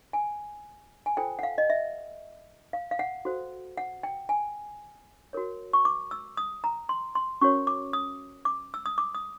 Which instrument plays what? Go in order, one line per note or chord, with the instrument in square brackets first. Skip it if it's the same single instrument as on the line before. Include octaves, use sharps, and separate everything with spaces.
[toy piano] G#5
G#5
F4 A4 C5 G5
F#5
F5
D#5
E5
F5
F5
F#5
F#4 A4 C5
F#5
G5
G#5
F#4 A#4 C#5
C#6
D6
E6
D#6
A#5
C6
C6
C#4 F#4 A#4 C#5 C#6
D6
D#6
D6
E6
D#6
D6
D#6